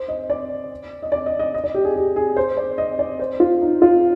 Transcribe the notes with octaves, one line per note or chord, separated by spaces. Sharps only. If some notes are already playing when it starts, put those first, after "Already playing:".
Already playing: C5
D#5
D5
D#5
D5
D#5
D#5
D#5
D5
G4
G#4
G4
G#4
C5
D5
D#5
D5
C5
F4
D#4
F4